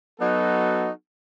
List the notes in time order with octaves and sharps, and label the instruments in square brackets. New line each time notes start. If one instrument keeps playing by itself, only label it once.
[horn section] F#3 B3 D#4 F#4 A4